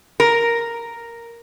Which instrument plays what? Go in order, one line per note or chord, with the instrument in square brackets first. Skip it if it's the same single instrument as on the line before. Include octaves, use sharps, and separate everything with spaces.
[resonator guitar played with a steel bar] A#4